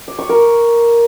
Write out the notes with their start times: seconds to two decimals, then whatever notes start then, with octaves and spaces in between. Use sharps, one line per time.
0.08 D6
0.18 C#6
0.29 A#4